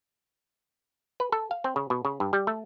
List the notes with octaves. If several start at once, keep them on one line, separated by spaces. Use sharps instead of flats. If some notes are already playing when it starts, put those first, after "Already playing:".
B4
A4
F5
C4
C#3
B2
C#3
G2
G3
A3